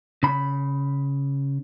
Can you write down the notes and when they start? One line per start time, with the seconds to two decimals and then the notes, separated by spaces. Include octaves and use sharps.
0.23 C#3 B5